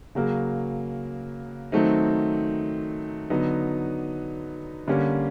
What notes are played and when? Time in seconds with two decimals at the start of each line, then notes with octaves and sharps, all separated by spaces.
0.15 C#3 F#3 A#3
1.72 D#3 F#3 A3 C4 D#4
3.30 D3 F#3 B3 D#4
4.88 D3 G3 A#3 C#4